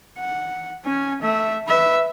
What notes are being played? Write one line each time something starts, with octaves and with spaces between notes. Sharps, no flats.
F#5
C#4 G#5
A3 E5
B4 E5